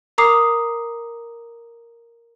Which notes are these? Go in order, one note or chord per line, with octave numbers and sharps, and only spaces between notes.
A#4 A#5 D6 D#6 C7